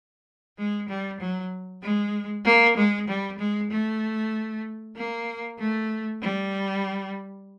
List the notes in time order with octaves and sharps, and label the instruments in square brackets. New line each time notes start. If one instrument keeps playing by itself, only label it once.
[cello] G#3
G3
F#3
G#3
A#3
G#3
G3
G#3
A3
A#3
A3
G3